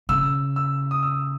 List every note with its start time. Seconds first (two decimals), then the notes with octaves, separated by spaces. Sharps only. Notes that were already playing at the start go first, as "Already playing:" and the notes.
0.09 C#3 E6
0.56 E6
0.91 D#6
1.03 E6